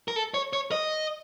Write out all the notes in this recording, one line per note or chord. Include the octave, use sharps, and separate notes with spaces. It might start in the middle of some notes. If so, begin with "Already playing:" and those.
A#4
A4
C#5
C#5
D#5